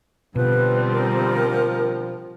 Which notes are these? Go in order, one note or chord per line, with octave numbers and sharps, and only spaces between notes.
B2 D3 F3 G3 C4 B4
A#4